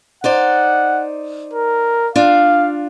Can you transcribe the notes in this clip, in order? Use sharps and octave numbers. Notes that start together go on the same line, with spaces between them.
D#4 C5 D5 F#5
A#4
D4 F4 F5